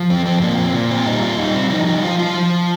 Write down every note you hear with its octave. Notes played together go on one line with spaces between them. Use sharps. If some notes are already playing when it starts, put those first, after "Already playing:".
Already playing: F3
F2 C4
C4
A#2 A#3
C4
A#2
C4
G3 D#4
F4
G3 D#4
C4
F3 D#4
D#4
F3 F4
F4
F3